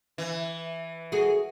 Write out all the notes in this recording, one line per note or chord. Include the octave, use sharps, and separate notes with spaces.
E3
F#4 G#4 A4